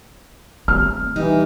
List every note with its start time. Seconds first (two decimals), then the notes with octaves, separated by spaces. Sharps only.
0.68 A3 C4 F6
1.16 E3 G3 D#4